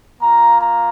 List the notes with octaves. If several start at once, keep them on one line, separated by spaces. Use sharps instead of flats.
A#3 F4 A#5
A#5